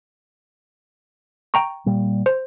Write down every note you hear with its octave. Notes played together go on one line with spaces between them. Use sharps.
G5 A#5 C#6
A#2 G3
C5